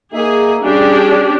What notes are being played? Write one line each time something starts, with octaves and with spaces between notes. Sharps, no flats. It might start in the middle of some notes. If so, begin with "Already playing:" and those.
A#3 D#4 G#4 E5
G3 C#4 D4 G4 G#4